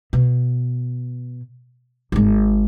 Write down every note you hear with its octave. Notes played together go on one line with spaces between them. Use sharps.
B2
G#1 G#3